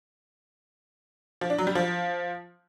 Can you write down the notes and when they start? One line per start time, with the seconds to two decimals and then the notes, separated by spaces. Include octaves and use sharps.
1.41 F3
1.50 D4
1.58 F#3
1.67 G3
1.75 F3